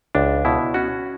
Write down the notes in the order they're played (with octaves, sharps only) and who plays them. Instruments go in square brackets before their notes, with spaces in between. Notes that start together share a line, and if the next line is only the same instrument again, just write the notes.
[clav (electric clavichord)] C#2 D4
B2 E4
C#4 F#4